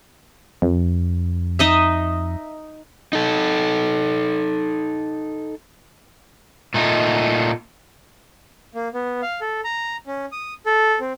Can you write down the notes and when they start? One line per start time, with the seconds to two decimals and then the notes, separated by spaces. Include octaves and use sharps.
0.62 F2
1.59 D#4 D#5 E5
3.13 D#4 A4
6.74 A#2 A3 D#4
8.75 A#3
8.94 B3
9.22 F5
9.41 A4
9.64 A#5
10.07 C#4
10.32 D#6
10.66 A4
11.00 C4